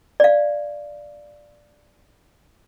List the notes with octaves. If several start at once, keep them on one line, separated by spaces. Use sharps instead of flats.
D5 F5